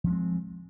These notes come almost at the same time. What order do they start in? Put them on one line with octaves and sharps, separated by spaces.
F3 C#4 G#3 C4